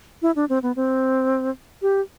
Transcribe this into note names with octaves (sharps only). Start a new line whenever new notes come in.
E4
D4
C4
B3
C4
G4